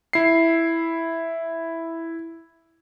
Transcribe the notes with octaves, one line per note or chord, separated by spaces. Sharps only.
E4 C7